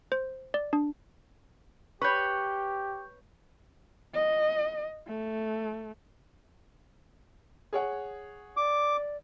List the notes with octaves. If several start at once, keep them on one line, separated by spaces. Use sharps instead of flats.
C5
D5
D4
G4 B4 C#5 C#6 G6
D#5
A3
G#4 C#5 F#5
D5 D6